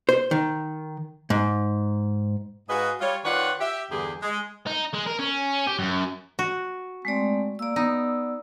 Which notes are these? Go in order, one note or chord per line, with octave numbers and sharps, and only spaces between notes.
C5
D#3
G#2
G#2 F#4 G#4 B4 D#5 F5
G3 F4 C#5
D#3 F4 B4 C#5 D5 F#5
G4 E5
E2 G2 D3 G4 G#4
G#3
D#4
G#3
A#4
C#4
G4
F#2
F#4
G#3 A3 C4 D5
A#3 D5 E6
B3 D#4